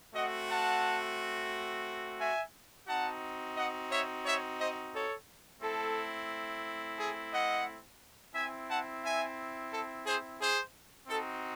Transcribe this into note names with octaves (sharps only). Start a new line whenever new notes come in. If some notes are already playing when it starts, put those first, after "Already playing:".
A3 C4 F#4 D#5 F#5
F#5 A5
E5 G#5
C4 D#4 F#4 F#5 A5
D#5 F#5
C#5 E5
C#5 E5
C5 D#5
A4 C#5
A3 C4 E4 A4
G#4
D#5 F#5
C4 E4 E5 G#5
F#5 A5
E5 G#5
A4
G#4 C5
G#4 C5
C4 D#4 F#4 A4